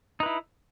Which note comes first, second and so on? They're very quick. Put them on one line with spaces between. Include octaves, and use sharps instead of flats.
D#4 B4 E4